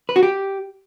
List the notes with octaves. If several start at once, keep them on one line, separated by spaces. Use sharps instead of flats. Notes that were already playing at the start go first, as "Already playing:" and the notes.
B4
F#4
G4